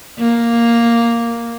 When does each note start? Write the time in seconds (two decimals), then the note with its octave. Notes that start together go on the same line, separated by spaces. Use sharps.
0.19 A#3